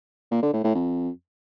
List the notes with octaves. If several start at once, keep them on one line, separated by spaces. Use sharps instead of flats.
A#2
D3
A2
A2
F2